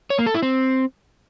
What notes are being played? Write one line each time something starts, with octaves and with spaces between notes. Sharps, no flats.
C#5
A#3
A4
E4
C4